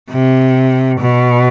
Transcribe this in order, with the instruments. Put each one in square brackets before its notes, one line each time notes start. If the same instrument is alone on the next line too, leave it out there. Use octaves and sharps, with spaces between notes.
[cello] C3
B2